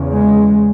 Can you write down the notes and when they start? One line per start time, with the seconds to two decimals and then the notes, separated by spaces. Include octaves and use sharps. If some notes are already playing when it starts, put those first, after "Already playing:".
Already playing: E2 C#3
0.14 G#3